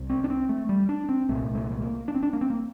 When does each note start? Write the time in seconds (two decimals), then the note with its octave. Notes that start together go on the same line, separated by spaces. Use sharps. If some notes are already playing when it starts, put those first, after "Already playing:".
Already playing: C2 C3
0.10 C4
0.24 D4
0.30 C4
0.49 A3
0.69 G3
0.89 D4
1.09 C4
1.29 C2 A#2 A3
1.55 A3
1.72 A3
1.81 A#3
2.08 D4
2.14 C4
2.23 D4
2.33 A#3
2.41 C4
2.50 A#3